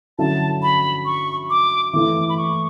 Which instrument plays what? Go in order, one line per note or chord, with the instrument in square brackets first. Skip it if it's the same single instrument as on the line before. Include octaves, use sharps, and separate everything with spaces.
[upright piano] D3 F#3 C#4 E4 [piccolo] A5
[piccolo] B5
C#6
D6
[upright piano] E3 A3 E4 [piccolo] D6
[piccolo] B5
C#6